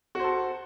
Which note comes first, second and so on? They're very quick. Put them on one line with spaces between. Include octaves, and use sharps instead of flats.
F#4 C5 A4